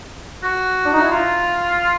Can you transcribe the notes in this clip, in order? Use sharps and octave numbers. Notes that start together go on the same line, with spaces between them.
F#4
D4
D#4
E4
F4